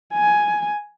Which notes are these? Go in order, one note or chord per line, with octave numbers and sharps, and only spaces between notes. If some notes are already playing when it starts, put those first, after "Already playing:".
G#5